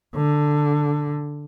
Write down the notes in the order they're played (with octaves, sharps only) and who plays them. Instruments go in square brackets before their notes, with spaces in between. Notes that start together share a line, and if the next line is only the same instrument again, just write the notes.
[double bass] D3